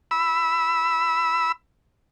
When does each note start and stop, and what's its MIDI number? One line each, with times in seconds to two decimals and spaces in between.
0.11 1.52 83
0.11 1.52 88